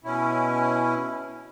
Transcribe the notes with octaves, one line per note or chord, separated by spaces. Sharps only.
B2 C#4 E4